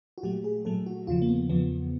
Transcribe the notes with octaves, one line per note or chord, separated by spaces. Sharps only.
F#4
A#2 F#3 A3 G4
G#4
A#2 F#3 A3 A4
F#4
E2 C#3 F3 F4
A#3
B3
E2 C#3 F3 B3